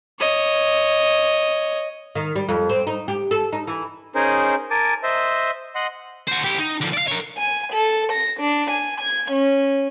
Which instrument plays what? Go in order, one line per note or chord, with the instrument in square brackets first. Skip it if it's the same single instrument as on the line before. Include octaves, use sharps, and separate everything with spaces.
[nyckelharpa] C#5 D#5
[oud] D#3
G3
F2
C4
D#4
G4
A4
D#4
E3
[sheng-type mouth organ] C#4 D#4 G#4 A#4 C5
A#4 G#5 A5 D6
C5 D#5 E5
D#5 F#5 C6
[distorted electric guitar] F#4 C5
E4 G4
D#4
D3 F3
D5 F5
A#4 C#5
[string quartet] G#5
A4
A#6
D4
G#5
G#6
C#4